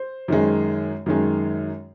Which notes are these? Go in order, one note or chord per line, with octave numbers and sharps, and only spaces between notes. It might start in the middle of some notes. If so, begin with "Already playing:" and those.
Already playing: C5
F#2 D#3 G#3
F#2 D#3 G#3